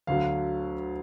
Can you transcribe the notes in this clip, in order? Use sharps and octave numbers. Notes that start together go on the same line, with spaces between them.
D2 D3 F#3 F5